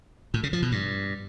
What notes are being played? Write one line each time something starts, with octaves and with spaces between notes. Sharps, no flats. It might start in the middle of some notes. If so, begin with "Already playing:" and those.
A2
C#3
F3
B2
G2